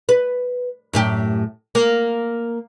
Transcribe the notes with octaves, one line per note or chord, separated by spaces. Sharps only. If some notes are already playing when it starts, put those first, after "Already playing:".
B4
F#2 A2 G4
A#3